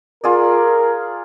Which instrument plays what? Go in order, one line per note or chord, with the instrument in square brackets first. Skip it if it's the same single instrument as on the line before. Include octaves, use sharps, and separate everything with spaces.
[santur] F4 G#4 D5 [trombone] A#4